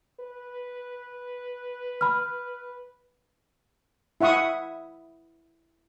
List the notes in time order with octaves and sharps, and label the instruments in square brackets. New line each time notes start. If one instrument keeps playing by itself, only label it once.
[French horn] B4
[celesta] B5 F6
[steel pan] E4 E5 F#5 C#6 D#6